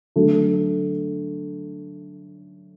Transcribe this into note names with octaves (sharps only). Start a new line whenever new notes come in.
D3 F#3 A3